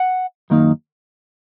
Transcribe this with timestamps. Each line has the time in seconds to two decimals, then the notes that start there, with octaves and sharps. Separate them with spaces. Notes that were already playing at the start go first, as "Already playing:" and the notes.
Already playing: F#5
0.50 F#2 D#3 A#3 D#4